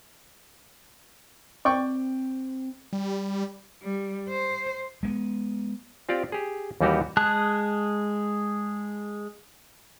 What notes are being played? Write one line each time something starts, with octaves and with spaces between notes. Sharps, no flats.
C4 D5 G5 C#6
G3
G3
C5
G#3 A3 B3
C4 F4 G4 D5
G4 G#4
D#2 E3 G3 D#4 F#4 G4
G#3 G#4 A5 F#6